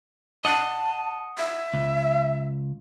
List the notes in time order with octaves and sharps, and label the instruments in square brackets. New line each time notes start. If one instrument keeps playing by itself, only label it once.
[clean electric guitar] D#5 F#5 [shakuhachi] A5
[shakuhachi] E5
[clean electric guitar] C#2